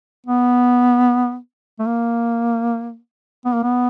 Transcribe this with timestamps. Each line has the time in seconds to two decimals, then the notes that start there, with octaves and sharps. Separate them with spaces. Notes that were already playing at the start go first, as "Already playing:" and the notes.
0.27 B3
1.79 A3
1.86 A#3
3.46 B3
3.55 A#3
3.63 B3